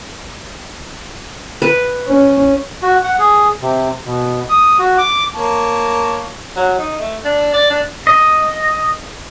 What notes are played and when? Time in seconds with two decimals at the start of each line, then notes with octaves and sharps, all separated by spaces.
1.62 B4
2.08 C#4
2.82 F#4
3.03 F#5
3.19 G#4
3.61 C3
4.05 B2
4.49 D#6
4.79 F#4
4.98 D6
5.34 A#3 C#5 A5
6.56 F#3
6.78 D#4
6.99 A3
7.24 D4
7.53 D5
7.70 D4
8.07 D#5